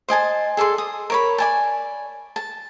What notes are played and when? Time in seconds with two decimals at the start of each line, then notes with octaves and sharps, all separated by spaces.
0.08 C5 D#5 G#5 A5
0.57 G#4 A4 D5 C6
0.78 D#6
1.10 A#4 C#5 B5
1.38 D5 G#5 A5
2.36 A5